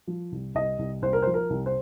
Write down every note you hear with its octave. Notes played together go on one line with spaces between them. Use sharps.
F3
C2
C2 D#5
C2
C2 C5
A#4
C5
F3
A#4
C2
C5